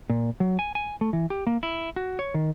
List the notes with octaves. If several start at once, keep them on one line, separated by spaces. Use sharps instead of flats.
A#2
F#3
G#5
G#5
A3
E3
G4
A#3
E4
F#4
C#5
D#3